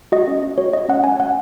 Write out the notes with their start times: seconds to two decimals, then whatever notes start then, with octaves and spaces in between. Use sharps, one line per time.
0.12 F#4 D#5
0.28 C#4
0.43 C#4
0.58 F#4 C#5
0.73 F#4 D#5
0.89 C#4 F#5
1.04 C#4 G#5
1.20 C#4 F#5